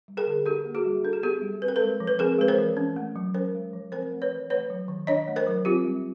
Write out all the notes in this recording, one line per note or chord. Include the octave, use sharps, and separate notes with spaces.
G3
G#4 A#4
D3
D4 G4 A4
A#3
F#4 G#4
G3
D4 A4
G#4
B3 G4 A4
G3
C4 B4
A#4
G#3 A4 B4
F3
B4
C4 G#4 A#4
G#3 B4
A#4 C5
E3
C#4
A3
F#3
C#4 A#4 C5
G#3
F3
C4 A#4 C5
A3
B4 C#5
E3
A3 B4 C#5
F#3
D#3
D4 C#5 D#5
A3
A#4 C5
F#3
C4 F4 G4
G3